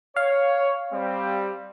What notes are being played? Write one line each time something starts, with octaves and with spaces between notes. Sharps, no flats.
C#5 F5
G3 C4